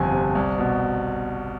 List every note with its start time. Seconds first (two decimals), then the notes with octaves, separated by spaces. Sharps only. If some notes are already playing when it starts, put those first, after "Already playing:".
Already playing: G1 F2 C3 F3 G#5
0.12 C3
0.35 C2
0.58 B2